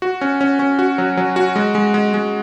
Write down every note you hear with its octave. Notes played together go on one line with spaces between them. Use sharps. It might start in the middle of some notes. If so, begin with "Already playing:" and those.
F#4
C#4
C#4
C#4
F#4
F#3
F#3
F#4
G#3
G#3
G#3
G#3